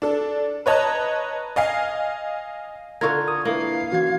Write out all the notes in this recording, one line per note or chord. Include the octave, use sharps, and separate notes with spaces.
D4 A4
B4 C#5 D#5 A5 A#5 F#6
D#5 F5 G#5 C7
D3 F4 A#4 C#6 G#6
D#6
A#3 D4 E4 B4 F5
E3 C#4 F#4 G#6